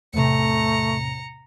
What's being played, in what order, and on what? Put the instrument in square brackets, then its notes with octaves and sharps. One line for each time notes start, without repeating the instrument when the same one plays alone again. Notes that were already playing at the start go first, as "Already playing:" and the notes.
[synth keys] E2 A2 C3 [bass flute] A3 [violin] A#5 C#7